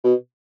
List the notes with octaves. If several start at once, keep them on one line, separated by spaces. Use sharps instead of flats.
B2